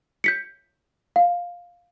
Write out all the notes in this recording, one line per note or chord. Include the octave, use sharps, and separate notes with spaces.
G6 B6 C#7
F5